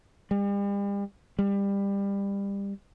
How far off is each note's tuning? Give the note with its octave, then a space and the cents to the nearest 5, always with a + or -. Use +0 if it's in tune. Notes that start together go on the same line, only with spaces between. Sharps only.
G3 +40
G3 +25